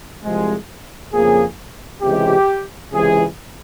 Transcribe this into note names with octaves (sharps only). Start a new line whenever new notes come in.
C2 C3 F3 G#3
F2 C#3 F3 A#3 G#4
C#2 C3 E3 G#3 G4
C#2 C3 E3 G#3 G#4